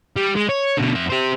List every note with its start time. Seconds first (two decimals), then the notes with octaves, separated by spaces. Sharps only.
0.16 G3
0.36 G#3
0.49 C#5
0.77 B2 D3
0.95 F2 E5
1.10 G4 C5